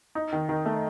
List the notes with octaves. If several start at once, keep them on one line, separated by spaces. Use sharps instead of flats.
D#4
D#3
D#3
A3